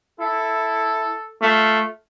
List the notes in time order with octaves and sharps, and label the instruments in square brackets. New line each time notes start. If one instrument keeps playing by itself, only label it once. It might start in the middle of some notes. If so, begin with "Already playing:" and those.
[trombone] E4 [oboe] A4
[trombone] A3 [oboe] F4